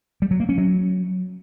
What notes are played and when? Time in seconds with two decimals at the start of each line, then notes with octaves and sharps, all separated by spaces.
0.22 G3
0.31 F#3
0.40 A#3
0.49 C#4
0.58 F#3